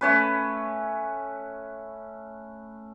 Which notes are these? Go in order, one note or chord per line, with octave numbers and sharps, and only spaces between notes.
A3 C#4 B4